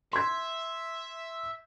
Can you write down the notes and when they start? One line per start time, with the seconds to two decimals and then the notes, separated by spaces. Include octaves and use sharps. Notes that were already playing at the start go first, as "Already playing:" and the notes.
0.13 E5 C6 G#6